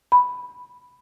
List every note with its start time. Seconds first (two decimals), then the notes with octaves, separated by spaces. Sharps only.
0.12 B5